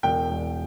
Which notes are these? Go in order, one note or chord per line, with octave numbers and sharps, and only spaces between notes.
E1 G5
E1